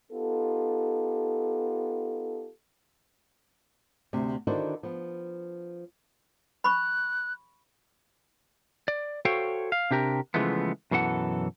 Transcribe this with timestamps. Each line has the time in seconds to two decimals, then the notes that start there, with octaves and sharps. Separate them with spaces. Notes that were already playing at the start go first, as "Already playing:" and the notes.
0.12 B3 D#4 F4 G4 A4
4.13 D2 C3
4.47 D3 D#3 D4 E4 F#4 C5
4.83 F3 B3
6.64 B5 C#6 F#6
8.88 D5
9.25 F#4 A4 C5 C#5 F5 G5
9.72 F5
9.91 C3 D4 G4 A#4
10.34 C#3 E3 F3 G#3 A3 B3
10.91 F#2 B2 E3 A4 F#5